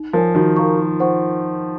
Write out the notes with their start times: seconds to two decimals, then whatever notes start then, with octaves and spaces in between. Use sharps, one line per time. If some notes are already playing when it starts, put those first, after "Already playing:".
Already playing: D#4
0.13 F3 A#4 C#5 G#5
0.35 D#3 F#4
0.56 A#4 F5 A#5 C#6
0.78 F4
1.00 C5 F#5 C#6